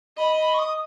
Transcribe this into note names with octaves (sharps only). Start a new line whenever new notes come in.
D#5 B5
B5
C#6
D#6